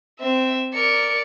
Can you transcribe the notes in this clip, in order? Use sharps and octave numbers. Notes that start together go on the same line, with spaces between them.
C4 E5
A#4 D5 C#7